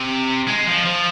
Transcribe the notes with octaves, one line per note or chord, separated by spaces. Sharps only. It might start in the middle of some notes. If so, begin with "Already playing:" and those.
Already playing: C3
G#3
F3
F3